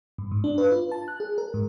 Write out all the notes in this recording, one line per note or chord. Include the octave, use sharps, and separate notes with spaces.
G2
G#2
D4
B4
F4
A5
F#6
G#4
A#4
G#2